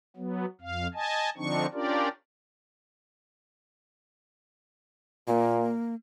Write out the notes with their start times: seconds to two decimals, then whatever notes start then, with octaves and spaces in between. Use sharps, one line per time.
0.16 F#3 B3
0.61 F2 F5
0.94 D#5 G#5 A5
1.37 D3 F3 C4 D4 D#4 C#6
1.73 C#4 D4 F4 G4 A#4 D5
5.28 A#2 A#3